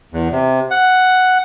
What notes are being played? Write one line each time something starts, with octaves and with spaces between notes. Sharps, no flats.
E2
C3
F#5